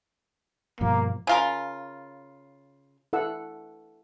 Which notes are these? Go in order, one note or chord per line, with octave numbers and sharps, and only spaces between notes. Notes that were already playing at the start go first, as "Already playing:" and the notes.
G2 B2 F3 A#3
C#3 F4 A#4
E4 A4 F#5 E6